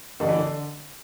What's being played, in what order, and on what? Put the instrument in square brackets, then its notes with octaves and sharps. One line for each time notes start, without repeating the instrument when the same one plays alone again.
[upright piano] A1 [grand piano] D3
[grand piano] E3
D3